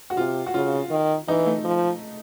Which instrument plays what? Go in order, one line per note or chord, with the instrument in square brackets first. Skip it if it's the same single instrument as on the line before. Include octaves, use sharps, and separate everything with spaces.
[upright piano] F#4
[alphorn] C3 [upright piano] F4
[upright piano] F#4
[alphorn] C#3 [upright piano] F4
[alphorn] D#3
[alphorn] E3 [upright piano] D#4
[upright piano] A3
[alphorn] F3